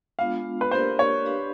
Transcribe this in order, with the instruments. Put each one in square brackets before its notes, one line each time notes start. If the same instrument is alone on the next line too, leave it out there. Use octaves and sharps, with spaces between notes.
[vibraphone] G#3 B3 D4 F4 [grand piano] F5
[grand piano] B4
[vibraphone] A#3 D4 G4 A#4 D5 [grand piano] C5
[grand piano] C#5
[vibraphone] D4 G4 B4 D5 F5